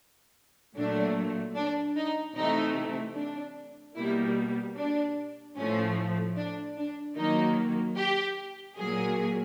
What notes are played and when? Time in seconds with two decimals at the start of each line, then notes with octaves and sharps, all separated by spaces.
0.76 A#2 F#3 A3 D4
1.56 D4
1.96 D#4
2.36 C3 E3 A3 D#4
3.16 D4
3.96 B2 G3 A#3 E4
4.76 D4
5.57 A2 F3 A3 C#4
6.37 D4
6.77 D4
7.17 D#3 F#3 A#3 D#4
7.97 G4
8.77 A#2 F#3 A#3 G#4